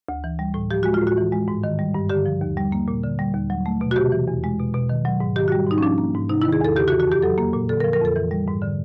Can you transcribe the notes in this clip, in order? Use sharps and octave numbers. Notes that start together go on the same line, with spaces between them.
D2
E3
G3
A2
F3 G4
G#3 F#4
F4
A2
F#4
E3
G#3
G#2
D#3
G3
G2
D3 G4
F3
D#2
G3
A#3
A#2
D3
G3
D#2
F#3
A3
B2
F#4
C3 G4
E3
E2
G#3
B2
B2
D#3
F#3
G#2
D#3 G4
F#4
G3
G#2 D#4
C#4
F3 D4
A#3
G#2
C3 D#4
E4
D#3
G#4
E2 A4
C#3 G4
F#4
E3
F#4
F2 G4
F#3 A4
A#3
A#2
D3 A4
A#4
F3
A#4
F2 A4
E3
G3
G#2
D3